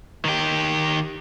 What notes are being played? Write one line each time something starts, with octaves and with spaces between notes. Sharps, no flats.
D#3 G4